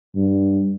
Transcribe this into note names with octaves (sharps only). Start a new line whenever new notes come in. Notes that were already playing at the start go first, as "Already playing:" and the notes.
G2